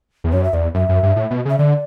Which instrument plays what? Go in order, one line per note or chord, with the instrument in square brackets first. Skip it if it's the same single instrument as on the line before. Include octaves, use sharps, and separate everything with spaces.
[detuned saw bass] E2
[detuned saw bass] F#2 [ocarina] C#5
[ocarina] E5
[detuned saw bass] E2 [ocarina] D5
[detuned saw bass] F#2 [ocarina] E5
[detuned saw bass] F#2
G2
A2
B2
[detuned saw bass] C#3 [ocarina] E5
[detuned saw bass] D3 [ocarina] D5